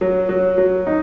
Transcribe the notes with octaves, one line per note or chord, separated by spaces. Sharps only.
F#3
F#3
F#3
D#4